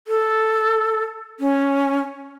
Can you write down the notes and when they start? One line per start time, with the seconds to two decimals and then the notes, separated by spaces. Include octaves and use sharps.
0.07 A4
1.40 C#4